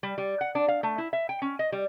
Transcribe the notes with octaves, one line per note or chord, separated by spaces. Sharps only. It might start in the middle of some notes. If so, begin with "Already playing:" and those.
G3
G3
F#5
D4
F5
A3
E4
E5
G5
C#4
D#5
G3